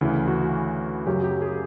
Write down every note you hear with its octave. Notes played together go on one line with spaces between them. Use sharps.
D2 C#3 E3
F#4
F#2 C#3 F#3 G4
G4
G#4